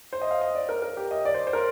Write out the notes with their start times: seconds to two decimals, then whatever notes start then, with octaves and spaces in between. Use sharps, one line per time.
0.13 C5
0.22 D#5
0.31 F5
0.41 D#5
0.55 D5
0.69 A#4
0.82 A#4
0.97 G4
1.11 D#5
1.25 D5
1.34 C5
1.47 C5
1.53 A#4